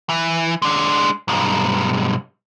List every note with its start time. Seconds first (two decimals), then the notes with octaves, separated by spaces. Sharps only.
0.09 E3
0.62 G#3 D4
1.28 B1 G2